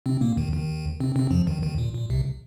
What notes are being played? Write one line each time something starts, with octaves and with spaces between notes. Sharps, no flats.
C3 C4
A#2 A#3
D#2 D#3
D#2 D#3
C3 C4
C3 C4
F2 F3
D#2 D#3
D#2 D#3
A#2
A#2
C2 C3